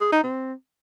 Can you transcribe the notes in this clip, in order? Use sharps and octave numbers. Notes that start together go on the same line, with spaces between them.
G#4
D#4
C4